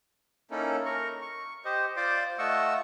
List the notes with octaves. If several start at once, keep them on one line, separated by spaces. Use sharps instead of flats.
A#3 C#4 D#4 E4 A4
A#4 C#6
C#6
G4 C5 D#5
F4 C5 D5 C6 D6
A3 F4 D#5 F#5 C#6 E6